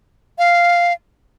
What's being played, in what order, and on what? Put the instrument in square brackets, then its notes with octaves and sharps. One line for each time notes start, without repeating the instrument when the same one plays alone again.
[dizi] F5